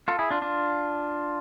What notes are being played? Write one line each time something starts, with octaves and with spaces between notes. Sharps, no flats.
F4 A4
E4 G#4
D4 F4
D4 F4